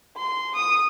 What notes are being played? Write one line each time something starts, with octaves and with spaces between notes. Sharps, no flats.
C6
D#6